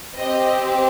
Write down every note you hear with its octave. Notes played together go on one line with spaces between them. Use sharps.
C4 G4 D#5